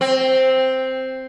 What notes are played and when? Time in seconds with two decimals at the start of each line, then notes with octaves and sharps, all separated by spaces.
0.01 C4